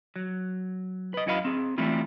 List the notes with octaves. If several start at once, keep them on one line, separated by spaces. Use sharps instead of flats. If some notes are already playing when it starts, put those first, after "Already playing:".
F#3
B4 D#5
F#2 E4 F#4 D#5 F5 B5
C4 G#4
E3 G3 A3 C4 E4 F4